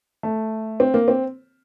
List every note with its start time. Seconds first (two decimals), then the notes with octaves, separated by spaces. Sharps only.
0.23 A3
0.80 C4
0.94 A#3
1.08 C4